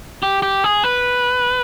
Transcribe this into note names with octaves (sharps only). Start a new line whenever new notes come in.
G4
G4
G#4
B4